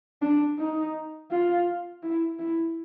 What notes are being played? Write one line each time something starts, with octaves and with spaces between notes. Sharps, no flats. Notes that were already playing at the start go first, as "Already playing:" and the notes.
D4
D#4
F4
E4
E4